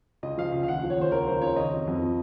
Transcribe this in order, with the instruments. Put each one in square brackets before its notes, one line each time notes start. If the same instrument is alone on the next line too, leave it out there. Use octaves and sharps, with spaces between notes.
[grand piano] C#2 D#5
F3 F5
C#2 F5
F5
D#2 F#5
F5
F3
C#5
D#2 C5
C#2 A#4
F3 C5
C#2 C#5
D#3 D#5
F2
F2
F3